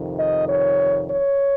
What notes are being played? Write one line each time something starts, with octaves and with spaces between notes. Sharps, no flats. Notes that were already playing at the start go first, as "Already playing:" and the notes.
Already playing: F2 C3 D#3
D#5
C#5
C#5